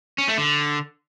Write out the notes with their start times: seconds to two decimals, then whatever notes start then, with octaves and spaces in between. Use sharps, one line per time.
0.18 C#4
0.28 A3
0.38 D3